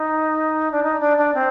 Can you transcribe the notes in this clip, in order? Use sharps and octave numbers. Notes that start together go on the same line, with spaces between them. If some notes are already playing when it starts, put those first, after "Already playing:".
Already playing: D#4
D4
D#4
D4
D4
C4